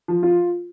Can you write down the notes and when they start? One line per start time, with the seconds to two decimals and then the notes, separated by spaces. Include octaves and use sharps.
0.08 F3
0.23 F4